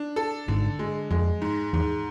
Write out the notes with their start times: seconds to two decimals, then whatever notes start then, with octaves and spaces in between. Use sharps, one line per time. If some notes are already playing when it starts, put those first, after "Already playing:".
Already playing: D4
0.16 A4
0.48 G#1 G#2 D3
0.79 G#3
1.11 F2 G#3
1.42 G#2
1.73 E2 G#2